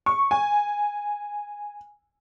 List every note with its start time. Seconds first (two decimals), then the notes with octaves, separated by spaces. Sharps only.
0.06 C#6
0.31 G#5